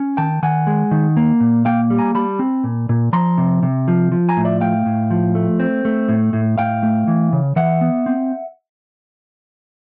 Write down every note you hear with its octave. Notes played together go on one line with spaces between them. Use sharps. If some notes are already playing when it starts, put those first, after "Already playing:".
Already playing: C#4
D#3 G5 A5
D#3 F#5 G#5
G#3
D#3
A#3
A#2
A#3 F5 G5
G3
G#5 A#5
G3 A5 B5
C4
A#2
A#2
F3 A#5 C6
C3
C3
F3
F3
G#5 A#5
A2
D5 E5
A3 F5 G5
A2
F3
A3
C4
A3
A2
A2
A2 F5 G5
A3
E3
C#3
E3 E5 F#5
B3
C4